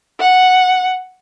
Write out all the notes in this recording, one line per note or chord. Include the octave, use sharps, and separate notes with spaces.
F#5